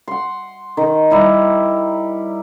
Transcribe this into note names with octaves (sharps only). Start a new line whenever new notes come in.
F#5 C6
D#3
G3 E4 A#5